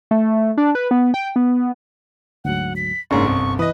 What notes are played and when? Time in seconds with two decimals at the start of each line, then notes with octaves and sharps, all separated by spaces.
0.11 A3
0.57 D4
0.75 B4
0.91 B3
1.14 G5
1.36 B3
2.45 D2 G#2 F#3 F#5
2.76 B6
3.11 F#1 G#2 A#3 C#4 D4 C#6
3.25 G1 C2 C4
3.59 E3 B4 D#5 D#6